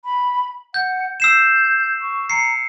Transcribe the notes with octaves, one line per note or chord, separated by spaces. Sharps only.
B5
F#5 G6
E6 G6 C7 E7
C#6
A#5 C7 C#7